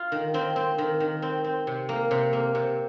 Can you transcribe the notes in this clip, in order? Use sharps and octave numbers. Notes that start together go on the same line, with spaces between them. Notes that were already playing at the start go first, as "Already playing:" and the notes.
Already playing: F4
D#3
D#3 C4
C4
D#3
D#3
C4
C4
C3
A#3
C3
A#3
C3